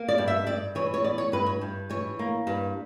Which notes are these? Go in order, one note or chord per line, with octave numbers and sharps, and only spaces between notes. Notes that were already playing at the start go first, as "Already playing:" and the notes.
Already playing: A#3
D5
G2
E5
G2 D5
E3 C#5
C#5
B3 D5
C#5
G2 B4
C#5
G2
E3 C#5
A#3
G2